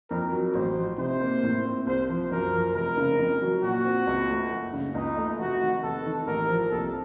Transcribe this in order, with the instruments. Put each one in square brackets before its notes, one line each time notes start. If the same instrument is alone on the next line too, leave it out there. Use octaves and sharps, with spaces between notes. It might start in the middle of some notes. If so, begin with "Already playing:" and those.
[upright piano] F2 [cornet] A#4
[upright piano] F#3
[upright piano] A1 [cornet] C5
[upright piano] F3
[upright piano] C3 [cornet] C5
[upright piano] A#3
A2
C4
[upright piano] C2 [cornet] C5
[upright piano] F3
[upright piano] F#2 [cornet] A#4
[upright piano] F3
[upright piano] F1 [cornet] A#4
[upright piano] C#3
F2
F#3
[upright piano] A#2 [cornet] F#4
[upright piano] C4
C#2
A3
F#1
C#3
[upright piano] C#2 [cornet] D#4
[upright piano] A3
[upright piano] F1 [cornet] F#4
[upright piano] D#3
[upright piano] F1 [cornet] A4
[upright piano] D#3
[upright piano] A1 [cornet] A#4
[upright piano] F3
[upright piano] C2 [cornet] A4